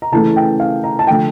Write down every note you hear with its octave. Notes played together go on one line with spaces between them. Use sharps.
A#5
C#3 E3 A3 C#4 A5
G5
F5
A#5
A5
D3 F3 A3 G5